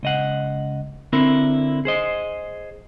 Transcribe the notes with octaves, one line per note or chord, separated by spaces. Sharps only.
C#2 D#5 F#5
D3 C4 E4 A#4
G#4 C5 D#5